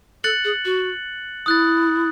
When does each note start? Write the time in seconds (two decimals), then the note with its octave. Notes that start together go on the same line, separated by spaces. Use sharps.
0.24 A4 F#6 A6 C#7 F#7
0.44 G#4
0.65 F#4
1.46 E4 D#6 F#6 A6